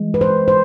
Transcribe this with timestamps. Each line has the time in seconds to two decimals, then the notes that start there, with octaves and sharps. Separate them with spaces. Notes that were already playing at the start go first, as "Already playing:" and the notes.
Already playing: E3 G#3
0.14 B4
0.21 C5
0.48 C5